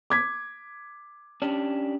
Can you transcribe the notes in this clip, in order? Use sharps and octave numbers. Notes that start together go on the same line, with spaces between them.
D6 G#6 B6
C#4 D4 G4